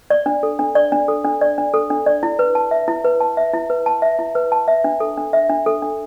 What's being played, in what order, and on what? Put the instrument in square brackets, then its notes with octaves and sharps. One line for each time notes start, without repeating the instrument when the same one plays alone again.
[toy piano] D5
D4
A4
D4
D5
D4
A4
D4
D5
D4
A4
D4
D5
E4
B4
A5
E5
E4
B4
A5
E5
E4
B4
A5
E5
E4
B4
A5
E5
D4
A4
D4
E5
D4
A4
D4